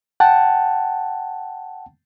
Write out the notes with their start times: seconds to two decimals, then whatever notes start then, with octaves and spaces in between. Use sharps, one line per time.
0.20 F#5 G5 A5